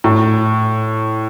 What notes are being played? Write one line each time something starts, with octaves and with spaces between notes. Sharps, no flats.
A2